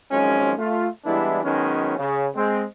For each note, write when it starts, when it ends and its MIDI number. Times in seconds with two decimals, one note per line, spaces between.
0.11 0.53 32
0.11 0.53 42
0.11 0.53 53
0.11 0.53 56
0.11 0.53 61
0.58 0.87 57
0.58 0.87 65
1.05 1.40 52
1.05 1.40 55
1.05 1.40 56
1.05 1.40 59
1.05 1.40 62
1.05 1.40 64
1.44 1.97 51
1.44 1.97 54
1.44 1.97 56
1.44 1.97 59
1.44 1.97 61
1.99 2.28 49
2.35 2.63 56
2.35 2.63 60